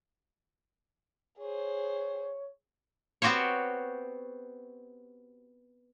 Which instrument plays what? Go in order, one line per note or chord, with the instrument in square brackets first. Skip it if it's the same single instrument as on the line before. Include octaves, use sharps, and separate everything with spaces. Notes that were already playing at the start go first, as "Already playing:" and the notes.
[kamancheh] G#4 C5 [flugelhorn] C#5
[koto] B3 C4 F#4 G4 C5 C#5